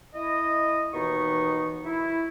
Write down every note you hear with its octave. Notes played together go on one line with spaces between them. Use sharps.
E4 D#5
D#2 B2 E3 D#4 C#6
E4